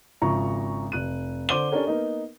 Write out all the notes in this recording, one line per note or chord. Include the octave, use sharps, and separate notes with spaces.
G#1 C#3 F3 E5 A#5 C#6
F1 F#6 D#7
D3 C5 D6 D#7 G7
C#4 D4 G4 A4 A#4 C#5
A#3 B3 D#4